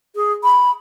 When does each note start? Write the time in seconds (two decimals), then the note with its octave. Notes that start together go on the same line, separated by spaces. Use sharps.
0.15 G#4
0.44 B5